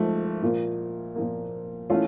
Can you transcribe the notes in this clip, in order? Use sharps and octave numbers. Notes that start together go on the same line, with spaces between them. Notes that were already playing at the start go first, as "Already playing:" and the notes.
Already playing: G#2 F3 A3
A#2 F3 A#3
A#2 F3 A#3
E3 A3 C#4 F4